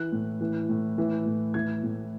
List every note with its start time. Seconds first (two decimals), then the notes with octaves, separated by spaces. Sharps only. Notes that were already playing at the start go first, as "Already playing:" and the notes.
Already playing: E3 F#6
0.12 A2
0.41 E3
0.69 A2
0.98 E3
1.25 A2
1.54 E3 G#6
1.83 A2